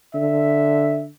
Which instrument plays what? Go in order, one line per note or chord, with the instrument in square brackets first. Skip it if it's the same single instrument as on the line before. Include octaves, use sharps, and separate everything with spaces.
[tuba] D3 [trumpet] E5